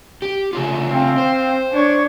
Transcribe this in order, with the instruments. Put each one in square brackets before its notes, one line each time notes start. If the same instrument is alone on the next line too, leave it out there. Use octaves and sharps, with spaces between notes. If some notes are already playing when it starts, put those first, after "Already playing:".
[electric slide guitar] G4
C#3 A3 F4
[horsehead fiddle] C4 F5
[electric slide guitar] C5
[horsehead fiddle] D4 C#5